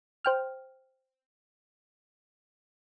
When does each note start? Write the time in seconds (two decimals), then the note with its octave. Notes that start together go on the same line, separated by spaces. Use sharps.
0.25 C5 G5 F6